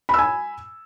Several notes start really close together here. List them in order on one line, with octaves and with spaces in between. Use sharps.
B5 E6 G#5